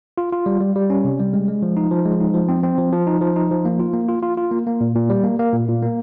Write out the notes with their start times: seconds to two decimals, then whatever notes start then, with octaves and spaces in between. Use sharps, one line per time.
0.18 F4
0.32 F4
0.46 G3
0.60 G3
0.76 G3
0.90 C#4
1.04 C3
1.19 G3
1.34 G#3
1.48 G#3
1.62 F3
1.77 D#4
1.91 F3
2.06 G#3
2.20 D#4
2.34 F3
2.48 C4
2.63 C4
2.78 F3
2.92 F3
3.07 D#4
3.21 F3
3.36 D#4
3.51 F3
3.65 A#3
3.80 F4
3.93 A#3
4.09 F4
4.22 F4
4.37 F4
4.51 A#3
4.67 A#3
4.81 A#2
4.95 A#2
5.10 G3
5.24 A#3
5.39 A#3
5.53 A#2
5.68 A#2
5.83 A#3